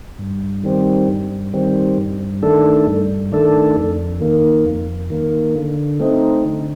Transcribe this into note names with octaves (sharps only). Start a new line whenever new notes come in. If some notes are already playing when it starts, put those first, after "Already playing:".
G2
D#3 G3 C4
G2
D#3 G3 C4
G2
D#3 A3 D4 A4
G2
D#3 A3 D4 A4
F2
D#3 A#3
F2
D#3 A#3
D3
A3 C4 D#4
D3